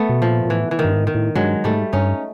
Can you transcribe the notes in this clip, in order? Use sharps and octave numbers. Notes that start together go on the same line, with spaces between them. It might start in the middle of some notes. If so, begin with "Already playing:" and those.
Already playing: A3 B3
B2
A#2 F3
A#2
A2 E3
E3
D#3
G2
G#2
D#3
A2
G2 F#3 G#3
G#2 G3 A3
G2 C#4 D#4